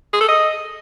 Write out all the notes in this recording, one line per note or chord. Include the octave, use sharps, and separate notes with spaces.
G#4
A4
D#5